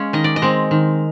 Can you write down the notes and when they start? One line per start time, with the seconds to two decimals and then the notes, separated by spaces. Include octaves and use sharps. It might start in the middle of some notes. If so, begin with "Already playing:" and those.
Already playing: G#3 C#4 F5
0.13 D#3 D#5
0.24 D5
0.36 D#5
0.42 G#3 C4
0.71 D#3